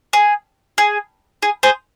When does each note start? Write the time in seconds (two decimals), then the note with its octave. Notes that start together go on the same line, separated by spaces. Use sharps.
0.13 G#4
0.78 G#4
1.42 G#4
1.63 G#4 C5